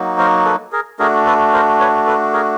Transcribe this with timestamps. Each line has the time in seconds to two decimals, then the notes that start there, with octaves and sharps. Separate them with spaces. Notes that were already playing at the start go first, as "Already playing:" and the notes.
Already playing: F#3 A#3 D#4 F#4
0.18 A#4 C5
0.45 A4 B4
0.72 G#4 A#4
0.99 A3 D4 F#4 G#4 A#4
1.26 A4 B4
1.53 A#4 C5
1.80 B4 C#5
2.07 A4 B4
2.33 G#4 A#4